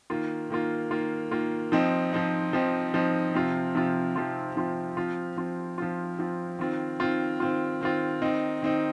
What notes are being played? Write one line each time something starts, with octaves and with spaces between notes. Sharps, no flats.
D#3 A#3 F4
D#3 A#3 F4
D#3 A#3 F4
D#3 A#3 F4
F3 C4 D#4
F3 C4 D#4
F3 C4 D#4
F3 C4 D#4
C3 F3 C4 F4
C3 F3 C4 F4
C3 F3 C4 F4
C3 F3 C4 F4
F3 C4 F4
F3 C4 F4
F3 C4 F4
F3 C4 F4
D#3 C4 F4
D#3 C4 F4
D#3 C4 F4
D#3 C4 F4
D#3 C4 D#4
D#3 C4 D#4